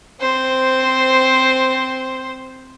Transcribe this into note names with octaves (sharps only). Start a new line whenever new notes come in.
C4 C5